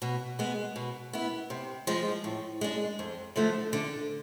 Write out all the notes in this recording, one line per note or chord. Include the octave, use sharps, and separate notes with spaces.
B2
G#3 B3
B2
B3 E4
C3
F3 G#3
A2
G#3 D4
F2
D3 F3 A3
D3